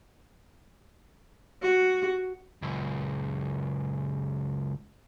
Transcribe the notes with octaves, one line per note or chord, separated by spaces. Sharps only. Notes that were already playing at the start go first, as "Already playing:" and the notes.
F#4
C#2 F#2